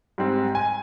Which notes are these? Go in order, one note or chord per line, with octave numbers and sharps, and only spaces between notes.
G#2 G3 C4
G#5